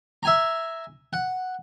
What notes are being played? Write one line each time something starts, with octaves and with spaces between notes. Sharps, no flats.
E5 G#5 A#5
F#5